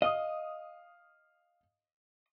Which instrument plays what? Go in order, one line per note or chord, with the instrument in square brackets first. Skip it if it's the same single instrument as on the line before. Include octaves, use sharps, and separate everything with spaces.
[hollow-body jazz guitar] D#5 [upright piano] F5 D#6